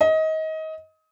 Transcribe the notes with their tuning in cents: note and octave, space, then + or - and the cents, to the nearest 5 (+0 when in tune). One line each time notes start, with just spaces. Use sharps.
D#5 +25